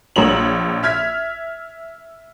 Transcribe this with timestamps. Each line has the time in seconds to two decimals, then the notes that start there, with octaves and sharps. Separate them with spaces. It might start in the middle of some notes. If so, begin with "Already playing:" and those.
0.16 A#1 D4 C#5 F#7
0.83 E5 F6 G#6 B6